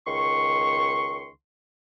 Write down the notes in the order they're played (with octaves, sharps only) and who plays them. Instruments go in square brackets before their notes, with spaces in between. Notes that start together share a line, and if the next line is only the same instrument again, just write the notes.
[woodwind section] C#2 D#3 C6 C#6